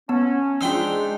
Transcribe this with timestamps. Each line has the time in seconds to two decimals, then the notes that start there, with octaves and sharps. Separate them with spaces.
0.09 B3 C#4 A5
0.61 G#3 D4 D#4 F4 C5 G5 E6